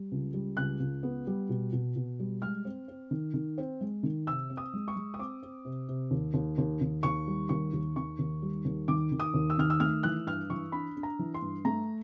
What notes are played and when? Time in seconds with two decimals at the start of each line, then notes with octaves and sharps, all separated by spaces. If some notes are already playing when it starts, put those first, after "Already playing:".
Already playing: G3
0.11 C#2
0.34 G3
0.57 C#2 F#6
0.80 C#2
1.03 B3
1.27 G3
1.49 B2
1.73 B2
1.96 B2
2.19 G3
2.42 G#3 F6
2.65 C4
2.88 C4
3.11 D#3
3.34 D#3
3.58 C4
3.81 G#3
4.03 D#3
4.27 C3 E6
4.50 C4
4.57 D#6
4.73 G#3
4.88 C#6
4.96 G#3
5.14 D#6
5.19 C4 D6
5.43 C4
5.65 C3
5.89 C3
6.11 D#2
6.34 D#2
6.58 D#2
6.81 D#2
7.03 D#2 C#6
7.27 G3
7.49 D#2 C#6
7.73 D#2
7.96 D#3 C#6
8.19 D#2
8.42 G3
8.65 D#2
8.88 D#3 D6
9.12 D#3
9.20 D#6
9.34 D#2
9.50 E6
9.58 D#3 F6
9.70 E6
9.80 A3 F6
10.03 E3 F#6
10.26 G2 F6
10.50 E3 C#6
10.72 D4 B5
10.96 D4
11.03 A#5
11.19 E3
11.34 C6
11.42 G2
11.65 A3 A#5